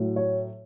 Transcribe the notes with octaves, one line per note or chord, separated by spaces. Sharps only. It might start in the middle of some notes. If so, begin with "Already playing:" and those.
Already playing: A2 F#3
C#5